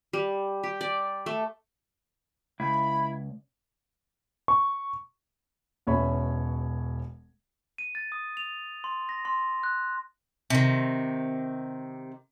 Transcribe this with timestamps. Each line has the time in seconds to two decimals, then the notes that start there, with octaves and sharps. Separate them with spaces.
0.13 G3
0.63 G4
0.81 D5
1.26 A3
2.60 C#2 E4 B5
4.48 C#6
5.87 E1 B2 C#4 C#5 E5 B5
7.78 D#7
7.95 A6
8.12 D#6
8.37 F7
8.84 C6
9.09 A#6
9.25 C6
9.63 F#6
10.50 C3 D#3